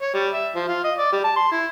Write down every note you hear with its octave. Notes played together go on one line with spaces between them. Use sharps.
C#5
G3
E5
F3
F4
D#5
D5
G3
A5
C6
E4